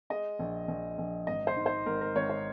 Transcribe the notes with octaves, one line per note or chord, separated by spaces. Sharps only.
G#3 D#5
A#1
A#1
A#1
G#1 D#5
C5
G#2
C5
G#1 A#4
A#4
G#1 C#5
C5